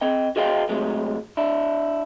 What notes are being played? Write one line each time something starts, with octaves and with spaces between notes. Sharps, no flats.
C4 D#5 G5
F#4 G#4 D#5 F5 G5
A2 C3 F#3 G#3
D4 E4